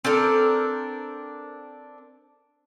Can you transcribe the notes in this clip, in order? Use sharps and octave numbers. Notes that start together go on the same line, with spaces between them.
C4 D4 A4 A#4